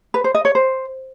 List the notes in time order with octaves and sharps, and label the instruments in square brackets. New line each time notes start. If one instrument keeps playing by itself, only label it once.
[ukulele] B4
C5
D#5
C#5
C5